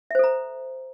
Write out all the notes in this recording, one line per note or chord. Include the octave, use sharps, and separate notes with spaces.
A4 C5 E5 A#5